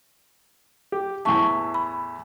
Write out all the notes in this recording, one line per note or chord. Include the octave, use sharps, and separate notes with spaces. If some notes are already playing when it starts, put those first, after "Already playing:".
G4
E2 A2 E5 A5 C#6
B5